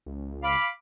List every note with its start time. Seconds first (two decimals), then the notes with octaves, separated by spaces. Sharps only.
0.06 C#2
0.43 F5 B5 D6